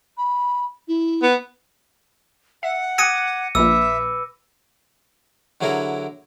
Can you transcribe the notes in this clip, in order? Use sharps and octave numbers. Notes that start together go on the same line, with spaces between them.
B5
E4
B3
E5 F#5
G5 D6 D#6 F#6 G#6 A#6 C#7 D#7
A#1 A#2 B4 E5 B5 D6 E6
D3 F#3 E4 G#4 A#4